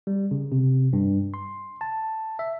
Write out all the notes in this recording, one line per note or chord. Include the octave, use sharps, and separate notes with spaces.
G3
C#3
C3
G2
C6
A5
E5